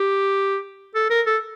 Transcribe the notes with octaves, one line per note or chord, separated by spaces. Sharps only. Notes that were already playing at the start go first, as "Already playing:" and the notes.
Already playing: G4
A4
A#4
A4